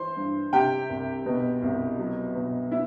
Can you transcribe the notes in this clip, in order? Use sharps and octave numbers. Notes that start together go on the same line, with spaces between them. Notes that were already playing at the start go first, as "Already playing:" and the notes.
Already playing: E3 C5 C6
G2
C3 G4 G5
C2
B2
C2
F#3
B2
E4